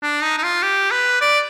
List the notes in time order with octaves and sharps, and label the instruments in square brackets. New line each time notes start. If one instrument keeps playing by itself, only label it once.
[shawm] D4
D#4
D#4
F4
G4
B4
D5